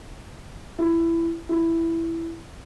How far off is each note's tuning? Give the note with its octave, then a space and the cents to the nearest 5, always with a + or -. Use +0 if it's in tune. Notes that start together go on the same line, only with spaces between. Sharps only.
E4 +15
E4 +5